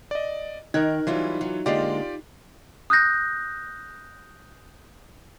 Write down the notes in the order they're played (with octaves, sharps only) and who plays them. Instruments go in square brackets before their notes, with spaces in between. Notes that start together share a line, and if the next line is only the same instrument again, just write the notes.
[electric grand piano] D5 D#5
[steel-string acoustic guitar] D#3 [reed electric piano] D#4 [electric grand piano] A#4 F#6 G#6
[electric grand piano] E3 F4 [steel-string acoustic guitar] F#3 G3 E4
[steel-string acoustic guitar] F#3
[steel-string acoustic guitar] D3 G#3 A#3 [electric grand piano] F4 G4 D5
[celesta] D#6 F#6 G6 A#6